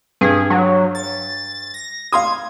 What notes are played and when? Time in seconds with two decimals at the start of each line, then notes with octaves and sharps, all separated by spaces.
0.21 G2 G#4
0.50 F#3
0.95 A6
1.74 A#6
2.12 F5 C6 D#6 G#6